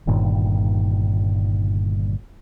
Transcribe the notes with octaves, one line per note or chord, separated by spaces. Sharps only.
G1 G2 A#2 D#3